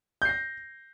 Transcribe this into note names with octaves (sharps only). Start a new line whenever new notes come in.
G6 A#6 C7